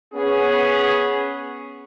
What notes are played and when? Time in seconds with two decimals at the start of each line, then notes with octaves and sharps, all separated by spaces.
0.14 B3 C#4 G#4